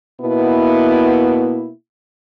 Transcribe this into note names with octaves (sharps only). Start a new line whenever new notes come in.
B2 A#3 B3 E4